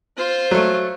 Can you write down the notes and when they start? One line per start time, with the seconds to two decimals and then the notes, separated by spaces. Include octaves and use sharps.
0.17 F4 C5
0.51 F#3 A3